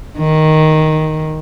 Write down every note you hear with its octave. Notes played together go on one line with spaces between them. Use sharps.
D#3